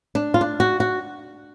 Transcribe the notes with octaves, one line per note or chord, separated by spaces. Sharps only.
D4
F4
D4
F#4
F#4